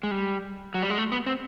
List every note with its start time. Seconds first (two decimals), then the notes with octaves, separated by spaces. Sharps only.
0.03 G#3
0.11 G3
0.74 F#3
0.82 G3
0.90 G#3
0.98 A3
1.12 B3
1.26 C4